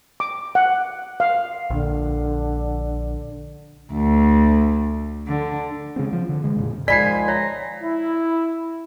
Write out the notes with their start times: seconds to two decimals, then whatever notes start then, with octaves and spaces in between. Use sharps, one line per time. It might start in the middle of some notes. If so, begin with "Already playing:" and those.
0.20 D6
0.55 F#5
1.20 F5
1.70 A#1 D3
3.93 D2
5.28 D3
5.96 C#3 G#3 C4
6.13 F3
6.29 D3
6.44 D3 G#3
6.57 F2 A#2 C#3
6.88 D#3 F3 G#3 D5 G#5 B5 B6 C7
7.28 C#5 A#5
7.83 E4